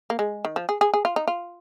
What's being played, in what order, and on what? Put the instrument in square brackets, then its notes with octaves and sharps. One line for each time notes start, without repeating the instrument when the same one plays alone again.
[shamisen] A#3
G#3
D#3
F3
G#4
G#4
G#4
F4
D#4
F4